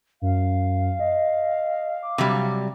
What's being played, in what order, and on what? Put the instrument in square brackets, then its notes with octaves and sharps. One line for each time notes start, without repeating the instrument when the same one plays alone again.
[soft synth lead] F#2 [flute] F5
[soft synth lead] D#5
D6
[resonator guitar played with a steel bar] C3 F#3 G3